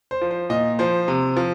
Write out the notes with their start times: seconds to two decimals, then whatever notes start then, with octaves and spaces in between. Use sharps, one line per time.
0.11 C5
0.21 F3
0.31 C5
0.50 A#2 D#5
0.79 F3 C5
1.08 C3
1.37 F3